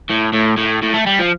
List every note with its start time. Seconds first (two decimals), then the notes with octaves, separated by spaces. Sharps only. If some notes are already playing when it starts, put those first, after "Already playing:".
0.10 A2
0.33 A2
0.57 A2
0.83 A2
0.94 A3
1.06 G3
1.19 F3